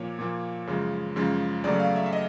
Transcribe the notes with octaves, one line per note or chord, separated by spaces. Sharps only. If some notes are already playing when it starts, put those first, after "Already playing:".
Already playing: A#2 F3 A#3 C#5
A#2 F3 A#3
F#2 C#3 F3 G#3
F#2 C#3 F3 G#3
E2 C#3 F#3 A3 D5
F5
E5
E5
D#5